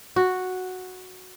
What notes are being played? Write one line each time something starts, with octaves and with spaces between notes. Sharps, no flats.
F#4